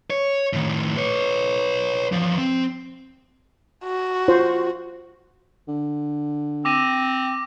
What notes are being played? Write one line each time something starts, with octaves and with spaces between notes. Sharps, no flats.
C#5
A2 D#3
B4 C#5
E2 F3
C4
F#4
F4 C5
D3
C4 D6 A#6 D#7